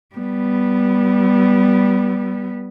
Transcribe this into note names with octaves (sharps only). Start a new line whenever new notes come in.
G3 B3